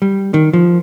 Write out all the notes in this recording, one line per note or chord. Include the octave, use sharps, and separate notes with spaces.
G3
D#3
F3